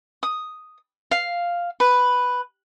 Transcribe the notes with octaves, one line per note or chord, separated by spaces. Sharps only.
D#6
F5
B4